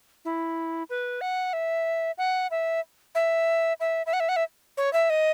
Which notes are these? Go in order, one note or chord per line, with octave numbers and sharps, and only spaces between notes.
E4
B4
F#5
E5
F#5
E5
E5
E5
E5
F#5
E5
F#5
E5
C#5
E5
D#5